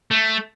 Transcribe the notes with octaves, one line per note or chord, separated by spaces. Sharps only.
A3